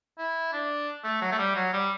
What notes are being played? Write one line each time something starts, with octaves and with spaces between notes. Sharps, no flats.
E4
D4
A3
F#3
A3
G3
F#3
G3